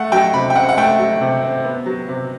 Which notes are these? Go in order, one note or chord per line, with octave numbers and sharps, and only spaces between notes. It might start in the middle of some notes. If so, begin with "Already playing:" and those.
Already playing: A3 F#5
F#3 G5
C3 B5
G5
C4 F#5
F#5
A3 G5
F#3
C3
C4
B3
F#3
C3